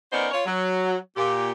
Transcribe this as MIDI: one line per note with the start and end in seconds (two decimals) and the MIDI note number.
0.13 0.29 59
0.13 0.29 61
0.13 0.29 63
0.13 0.29 70
0.13 0.29 72
0.13 0.29 74
0.31 0.45 65
0.31 0.45 73
0.45 0.95 54
1.17 1.52 46
1.17 1.52 67